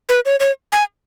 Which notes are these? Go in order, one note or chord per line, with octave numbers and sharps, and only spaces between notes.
B4
C#5
C#5
G#5